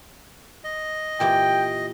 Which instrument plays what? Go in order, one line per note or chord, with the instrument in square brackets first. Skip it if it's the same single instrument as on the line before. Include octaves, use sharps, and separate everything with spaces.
[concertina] D#5
[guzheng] A#2 E3 G4 [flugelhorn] G5